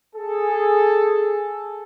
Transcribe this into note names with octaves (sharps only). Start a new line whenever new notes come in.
G#4 A4